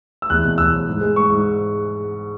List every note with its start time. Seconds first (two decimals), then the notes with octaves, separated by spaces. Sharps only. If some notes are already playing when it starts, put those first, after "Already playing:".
0.22 E6
0.30 E2 F#6
0.45 B2
0.58 E2 E6
0.73 F#3
0.88 G#2
1.01 G#3
1.16 G#3 C#6
1.30 G#2